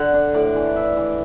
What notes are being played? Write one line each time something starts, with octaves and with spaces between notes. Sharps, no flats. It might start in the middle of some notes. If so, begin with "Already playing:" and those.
Already playing: D3 F#5
D4
A2 D5
E3
D4 E5
E3